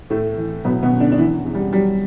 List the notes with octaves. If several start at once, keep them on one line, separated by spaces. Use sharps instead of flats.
A2 A3
E3
B2 F#3 B3
B2 B3
F#2
D3 D4
D4
E3 E4
E2
G3
F#3 G3